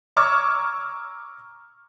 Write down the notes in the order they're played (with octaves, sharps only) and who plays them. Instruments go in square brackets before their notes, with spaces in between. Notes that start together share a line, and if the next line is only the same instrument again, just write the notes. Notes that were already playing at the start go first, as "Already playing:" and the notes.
[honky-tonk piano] A#5 C#6 D6 E6 F6 G#6